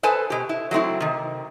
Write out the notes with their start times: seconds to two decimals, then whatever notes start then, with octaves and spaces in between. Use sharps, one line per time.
0.03 A4 B4 C5 G#5 A5
0.30 B2 G4
0.49 E4
0.71 F#3 A3 C4 E4
1.00 C3 D#3